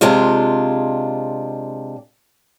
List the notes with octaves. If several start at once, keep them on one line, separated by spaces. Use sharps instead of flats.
C3 G#3 D4 F4